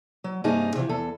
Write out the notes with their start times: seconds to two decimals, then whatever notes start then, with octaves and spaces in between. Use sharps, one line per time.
0.24 F#3
0.44 G2 C3 A#3 D#4 G#4 A5
0.75 C3 E3 F3
0.89 E2 A4